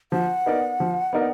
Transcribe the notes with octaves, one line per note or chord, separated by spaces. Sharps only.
F3 F#5
B3 D#4 A#4 D5
F3
B3 D#4 A#4 D5